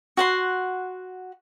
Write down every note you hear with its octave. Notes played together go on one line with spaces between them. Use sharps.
F#4 F#5 C6